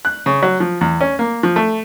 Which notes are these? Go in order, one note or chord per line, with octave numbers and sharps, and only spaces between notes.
F#6
C#3
F#3
F3
E2
C#4
A#3
F3
A3